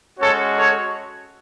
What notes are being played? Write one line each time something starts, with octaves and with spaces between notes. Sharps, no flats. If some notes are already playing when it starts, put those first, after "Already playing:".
G#3 C#4 F#4 A4 C#5
A4 C#5